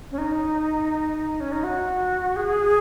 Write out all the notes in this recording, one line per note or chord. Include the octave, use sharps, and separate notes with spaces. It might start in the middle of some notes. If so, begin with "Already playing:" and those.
C#4
D#4
C#4
D#4
F#4
G#4